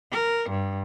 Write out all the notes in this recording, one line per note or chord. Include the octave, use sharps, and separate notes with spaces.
A#4
G2